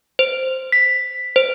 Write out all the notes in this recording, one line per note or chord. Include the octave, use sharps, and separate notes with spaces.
C5
B6
C5